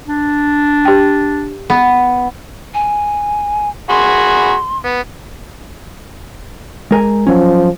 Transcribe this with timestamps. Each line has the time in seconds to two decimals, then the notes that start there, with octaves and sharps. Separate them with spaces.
0.08 D4
0.85 G4 G5
1.70 B3
2.74 G#5
3.90 F#4 G#4 B5 C6
4.85 B3
6.91 G#3 A#4 G#5
7.27 F3 F#3 C#4